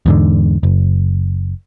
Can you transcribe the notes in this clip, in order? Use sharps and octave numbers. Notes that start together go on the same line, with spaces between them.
E2 G#2 D3
F#1